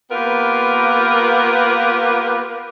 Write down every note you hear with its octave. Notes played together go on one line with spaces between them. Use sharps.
A#3 B3 F4 G4 A#4 B4